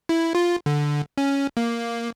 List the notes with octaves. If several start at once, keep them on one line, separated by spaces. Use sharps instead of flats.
E4
F4
D3
C#4
A#3